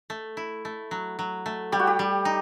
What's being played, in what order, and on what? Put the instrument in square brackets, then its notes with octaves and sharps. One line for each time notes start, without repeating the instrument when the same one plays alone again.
[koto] A3
E4
A3
F#3
F#3
A3
[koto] G3 [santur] G4
[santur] F#4
G4
[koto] G3
D#4